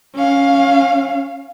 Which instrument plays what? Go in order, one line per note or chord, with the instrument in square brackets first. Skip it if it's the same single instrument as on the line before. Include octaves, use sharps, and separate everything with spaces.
[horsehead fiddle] C#4 F5